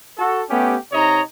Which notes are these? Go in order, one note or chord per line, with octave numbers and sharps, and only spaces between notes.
F#4 A4
A3 B3 C#4 G4
C3 D#4 C#5 D#5 A#5